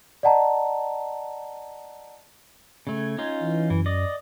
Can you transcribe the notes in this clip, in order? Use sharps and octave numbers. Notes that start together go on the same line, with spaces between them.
D5 D#5 F#5 A5 A#5
C#3 A3 G#6
C#4 D#4 F4
E3
F#2 E3
D5 D#5